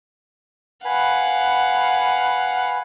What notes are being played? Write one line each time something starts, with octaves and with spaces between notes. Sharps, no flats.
B4 F5 F#5 G#5 B5